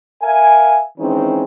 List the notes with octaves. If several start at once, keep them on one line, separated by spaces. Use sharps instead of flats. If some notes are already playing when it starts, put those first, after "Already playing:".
A#4 E5 F5 G#5
D#3 E3 G#3 C4 C#4 D#4